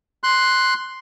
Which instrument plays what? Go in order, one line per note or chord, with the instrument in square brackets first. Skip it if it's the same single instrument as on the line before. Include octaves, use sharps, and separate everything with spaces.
[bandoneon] C6 F#6